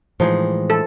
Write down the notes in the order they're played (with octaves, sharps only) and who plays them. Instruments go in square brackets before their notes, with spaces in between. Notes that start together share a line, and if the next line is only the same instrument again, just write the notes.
[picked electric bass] A2 E3 G#3 [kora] F3 D#4 G#4
[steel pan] A4